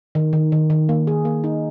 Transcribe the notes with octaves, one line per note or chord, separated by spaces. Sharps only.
D#3
D#3
D#3
D#3
A#3
G#4
A#3
D#4